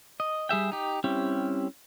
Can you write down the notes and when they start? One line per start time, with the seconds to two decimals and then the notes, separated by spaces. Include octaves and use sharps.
0.20 D#5
0.49 G3 G#4 E5 G5
0.72 D#4 G4
1.04 G3 C4 C#4 E4 G4